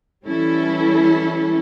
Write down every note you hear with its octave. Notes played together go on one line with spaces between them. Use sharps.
E3 G3 C#4 E4 A4